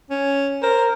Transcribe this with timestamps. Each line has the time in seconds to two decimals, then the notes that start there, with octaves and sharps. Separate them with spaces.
0.10 C#4
0.63 A#4 C5